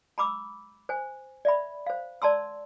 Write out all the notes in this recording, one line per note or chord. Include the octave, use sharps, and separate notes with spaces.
A#5 B5 D6 E6
C5 G#5
D5 E5 B5
C5 F5
D5 A5 A#5 C6 E6